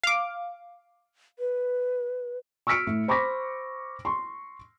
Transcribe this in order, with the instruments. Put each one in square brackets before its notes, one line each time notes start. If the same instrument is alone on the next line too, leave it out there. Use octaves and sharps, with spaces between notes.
[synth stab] F5 D6
[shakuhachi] B4
[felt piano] C#6 E6 F6 B6 C#7 D7
A2
C5 B5 C#6 D6 A#6 B6
C6 C#6